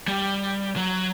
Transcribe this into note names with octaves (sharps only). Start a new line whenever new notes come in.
G3
F#3